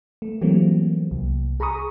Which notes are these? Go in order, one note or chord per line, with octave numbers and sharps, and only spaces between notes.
A3
E3 F#3 G3 A3 A#3 C4
C2
G#4 A#5 B5 C#6 D#6